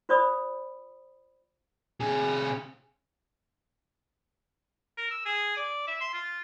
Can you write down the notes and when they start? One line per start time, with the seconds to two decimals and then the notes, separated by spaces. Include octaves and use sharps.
0.09 F4 C5 D5 B5 D#6
2.00 C3 G#4
4.98 A#4
5.11 E6
5.25 G#4
5.57 D5
5.87 E5
6.01 C6
6.14 F4